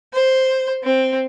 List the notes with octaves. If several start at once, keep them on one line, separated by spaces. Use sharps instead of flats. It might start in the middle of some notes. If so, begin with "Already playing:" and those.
C5
C4